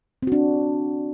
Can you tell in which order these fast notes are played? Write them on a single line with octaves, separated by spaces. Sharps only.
C4 F#4 D4